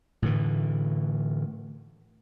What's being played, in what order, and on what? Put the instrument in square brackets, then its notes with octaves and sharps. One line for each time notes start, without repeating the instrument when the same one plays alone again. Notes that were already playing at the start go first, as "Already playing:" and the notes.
[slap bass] A2 D3 E3